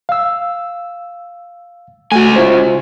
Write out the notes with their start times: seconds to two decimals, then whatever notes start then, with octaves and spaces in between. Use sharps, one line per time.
0.09 F5 E6
2.12 C#2 A3 F#4 G#5
2.36 E4 F4 C5